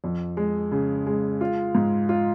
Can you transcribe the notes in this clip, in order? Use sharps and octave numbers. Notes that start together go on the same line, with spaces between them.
F2
G#3
C#3
G#3
F4
G#2
F4